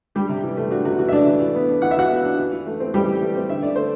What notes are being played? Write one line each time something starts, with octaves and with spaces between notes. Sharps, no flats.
G3 D4 G4
C3
E3
A3
D4 F#4
C3 F#4
E3 F#4
E5
A3 D4 D5
E3
E3
B3
D4
E3 F#5
E5
E3 F#4 F#5
B3
D4
E3
E3
A3
C4
E3 G3 G4
E3
A3
C4
D3 E5
D3 D5
A3 C5